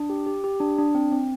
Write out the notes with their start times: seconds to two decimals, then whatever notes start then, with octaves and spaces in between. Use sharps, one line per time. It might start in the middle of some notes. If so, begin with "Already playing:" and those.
Already playing: D4
0.10 G4
0.26 G4
0.44 G4
0.60 D4
0.78 D4
0.95 C4
1.12 C4